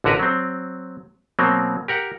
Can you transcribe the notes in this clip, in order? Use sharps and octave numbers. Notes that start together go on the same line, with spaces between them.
A1 D3 F#4 A#4 B4
F#3 C4
B2 F#3 A#3 C4
G4 A#4 F#5